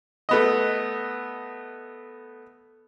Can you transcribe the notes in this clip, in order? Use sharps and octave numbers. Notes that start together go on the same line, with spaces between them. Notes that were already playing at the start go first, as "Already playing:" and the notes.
A3 B3 D#5